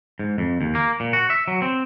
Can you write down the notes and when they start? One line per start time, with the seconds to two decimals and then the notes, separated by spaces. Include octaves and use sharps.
0.19 G#2
0.38 F2
0.61 D#2
0.75 A#3
1.00 A#2
1.13 F#4
1.30 E5
1.48 F#3
1.62 C4